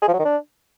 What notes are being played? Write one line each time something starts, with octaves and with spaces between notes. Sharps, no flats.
G#4
F3
F#3
D#3
D4